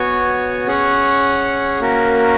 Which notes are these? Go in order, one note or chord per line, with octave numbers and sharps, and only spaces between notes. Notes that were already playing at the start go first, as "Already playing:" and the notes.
Already playing: B3 F#4 C#5 G#5
C#4 G#4 C#5 F#5
A#3 C#4 F#4 A#4